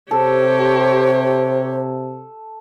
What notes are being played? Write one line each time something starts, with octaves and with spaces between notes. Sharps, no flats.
C3 G4 A4 C5 C#5